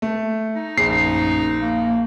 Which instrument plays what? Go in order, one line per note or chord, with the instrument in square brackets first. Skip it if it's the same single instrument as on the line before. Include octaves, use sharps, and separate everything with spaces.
[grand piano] A3
[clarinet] D#4
[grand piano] A#1 [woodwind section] G#4 [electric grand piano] C7
[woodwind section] F#2
A#3